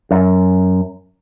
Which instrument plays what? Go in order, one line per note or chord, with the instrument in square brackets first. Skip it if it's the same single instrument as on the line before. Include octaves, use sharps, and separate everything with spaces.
[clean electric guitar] F#2